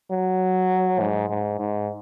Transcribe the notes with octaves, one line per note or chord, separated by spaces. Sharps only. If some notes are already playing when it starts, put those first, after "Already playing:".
F#3
G#2
G#2
G#2